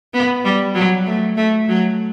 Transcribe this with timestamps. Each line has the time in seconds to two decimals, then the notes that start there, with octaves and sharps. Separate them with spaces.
0.14 B3
0.45 G3
0.75 F#3
1.07 A3
1.37 A3
1.68 F#3